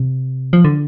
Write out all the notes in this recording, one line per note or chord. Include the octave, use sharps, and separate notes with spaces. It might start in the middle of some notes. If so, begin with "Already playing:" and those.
Already playing: C3
F3
D3